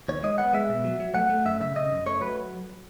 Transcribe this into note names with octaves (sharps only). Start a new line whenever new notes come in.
D#2 C#5
G#3 D#5
B3 F#5
G#3 E5
B2
F#3
F#3
A3 F#5
A3
F#2 E5
C#3 E5
C#3 D#5
F#2
A3 C#5
F#3 B4